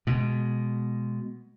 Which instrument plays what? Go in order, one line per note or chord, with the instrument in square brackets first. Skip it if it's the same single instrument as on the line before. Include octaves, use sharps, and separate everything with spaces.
[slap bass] B2 G#3